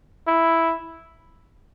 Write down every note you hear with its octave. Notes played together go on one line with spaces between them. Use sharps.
E4